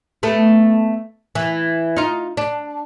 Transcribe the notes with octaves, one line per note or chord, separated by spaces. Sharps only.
A3 B3
E3
D#4 F4
D4